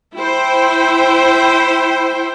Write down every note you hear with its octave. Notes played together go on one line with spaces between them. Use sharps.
E4 C5 G5